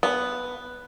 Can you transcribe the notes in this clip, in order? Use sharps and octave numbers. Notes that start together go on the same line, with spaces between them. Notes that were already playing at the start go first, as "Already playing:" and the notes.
B3